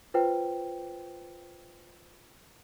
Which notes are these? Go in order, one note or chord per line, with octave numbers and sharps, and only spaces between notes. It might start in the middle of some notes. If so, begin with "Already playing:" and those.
F4 B4 C5 G5